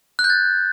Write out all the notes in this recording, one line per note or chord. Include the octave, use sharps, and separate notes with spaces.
F#6
G6
A6